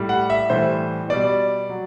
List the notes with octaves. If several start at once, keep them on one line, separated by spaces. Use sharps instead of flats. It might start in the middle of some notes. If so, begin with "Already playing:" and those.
Already playing: A2 G3
F#5
E5
A2 E3 G3 C5
B2 G3 D5
F#3